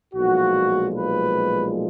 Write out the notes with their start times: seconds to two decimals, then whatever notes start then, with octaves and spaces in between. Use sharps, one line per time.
0.14 B1 A#2 F3 G#3 F#4
0.96 B4